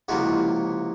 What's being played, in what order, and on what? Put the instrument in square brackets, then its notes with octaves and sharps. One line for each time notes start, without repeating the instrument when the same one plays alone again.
[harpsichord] C#2 C3 F3 A#3 E4 F#4